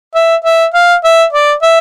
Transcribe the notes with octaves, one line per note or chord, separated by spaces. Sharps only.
E5
E5
F5
E5
D5
E5